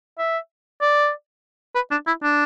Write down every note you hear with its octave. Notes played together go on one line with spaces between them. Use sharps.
E5
D5
B4
D4
E4
D4